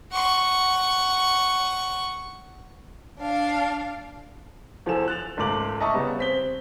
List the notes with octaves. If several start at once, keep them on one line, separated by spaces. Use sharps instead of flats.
F#5 C#6
D4 F5
E2 F3 A4 G#5 E7
F#6 A6 F7
G#1 C#2 A3 D6 F#7
D#5 E5 A5 A#5 C#6 D#6
C#3 G3 B3
C4 B6 G7